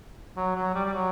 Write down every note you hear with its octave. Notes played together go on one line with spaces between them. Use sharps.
F#3
F#3
G3
G3
F#3